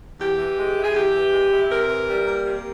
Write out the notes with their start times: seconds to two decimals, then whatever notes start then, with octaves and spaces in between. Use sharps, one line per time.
0.19 E2 G4
0.38 E3
0.57 G#3
0.76 E4
0.83 G#4
0.94 E2 G4
1.13 E3
1.32 G#3
1.51 E4
1.70 C3 A#4
1.89 E3
2.08 G3
2.26 A#3
2.45 C3